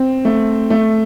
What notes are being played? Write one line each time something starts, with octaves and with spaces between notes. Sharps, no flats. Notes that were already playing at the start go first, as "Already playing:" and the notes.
Already playing: C4
A3
A3